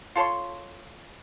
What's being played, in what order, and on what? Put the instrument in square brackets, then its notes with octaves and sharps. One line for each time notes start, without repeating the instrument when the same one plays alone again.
[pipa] F4 A4 C#5 C6